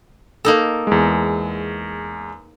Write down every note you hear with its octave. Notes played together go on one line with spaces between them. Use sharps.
A#3 D#4 A4
E2 G#3